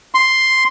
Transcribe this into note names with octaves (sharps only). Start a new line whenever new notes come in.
C6